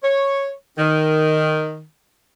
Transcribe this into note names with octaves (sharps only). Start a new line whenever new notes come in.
C#5
D#3